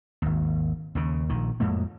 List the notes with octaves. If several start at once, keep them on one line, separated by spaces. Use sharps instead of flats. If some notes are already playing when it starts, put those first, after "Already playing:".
G#1 D#2
D#2 C#3
A#1 D#3
F2 A2 G#3 A#3